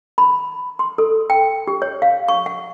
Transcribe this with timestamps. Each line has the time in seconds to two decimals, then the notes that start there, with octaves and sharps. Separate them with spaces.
0.18 B5
0.79 C6
0.98 A4
1.30 G5
1.67 G4
1.82 C#5
2.02 F5
2.28 C#6
2.46 F#5